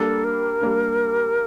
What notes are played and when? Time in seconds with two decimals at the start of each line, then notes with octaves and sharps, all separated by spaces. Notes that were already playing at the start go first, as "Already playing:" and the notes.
Already playing: G3 A#3 D4 A4
0.24 A#4
0.62 G3 A#3 D4